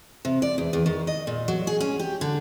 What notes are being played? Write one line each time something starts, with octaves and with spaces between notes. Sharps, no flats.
C3
D5
E2
E2
D#3
D#5
A#2
F#3
G#4
C#4
G4
D3